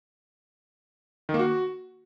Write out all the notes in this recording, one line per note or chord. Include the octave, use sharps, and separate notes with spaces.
D#3
A#3
F#4